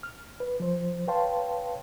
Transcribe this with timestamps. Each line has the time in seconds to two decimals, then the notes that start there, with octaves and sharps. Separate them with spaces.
0.03 F6
0.40 B4
0.60 F3 C5
1.08 B4 C#5 F5 G5 A5 C6